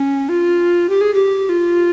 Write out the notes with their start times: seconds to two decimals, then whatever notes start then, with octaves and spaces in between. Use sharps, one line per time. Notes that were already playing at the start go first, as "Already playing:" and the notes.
Already playing: C#4
0.29 F4
0.89 G4
1.01 G#4
1.14 G4
1.49 F4